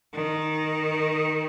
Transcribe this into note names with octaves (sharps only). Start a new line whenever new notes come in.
D#3